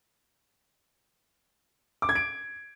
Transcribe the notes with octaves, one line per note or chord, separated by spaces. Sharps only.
D6
G#6
D7